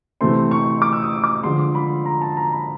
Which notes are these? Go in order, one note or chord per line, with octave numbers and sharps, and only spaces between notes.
C3 E3 A3 C4 C6
C#6
D6
E6
D#6
D6
D3 F3 G#3 C6
B5
A#5
A5
A#5
B5